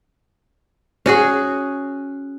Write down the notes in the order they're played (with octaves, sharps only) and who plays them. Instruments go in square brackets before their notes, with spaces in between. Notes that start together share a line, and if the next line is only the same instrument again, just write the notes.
[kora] C#4 F#4 G#4